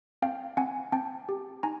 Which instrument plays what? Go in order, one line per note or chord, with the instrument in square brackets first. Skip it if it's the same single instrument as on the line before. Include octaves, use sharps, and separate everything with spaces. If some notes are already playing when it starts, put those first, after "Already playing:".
[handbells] C4 F5 G5
C4 F#5 G#5
C4 G5 A5
G4
D#4 G#5 A#5